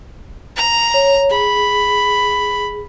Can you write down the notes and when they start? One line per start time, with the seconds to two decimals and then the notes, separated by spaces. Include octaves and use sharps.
0.57 A#5
0.94 C#5
1.31 G#4 B5